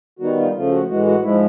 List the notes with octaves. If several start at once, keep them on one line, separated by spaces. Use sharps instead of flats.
D#3 G3 B3 D#4 F#4
F4
C#3 F3 A3 F4
F#4
A2 E3 G#3 F#4
F#4
G#2 F3 G#3 E4